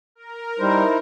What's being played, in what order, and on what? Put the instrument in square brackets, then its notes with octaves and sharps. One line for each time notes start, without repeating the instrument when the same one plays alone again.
[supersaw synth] A#4
[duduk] G3 [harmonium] D#4 E4 C5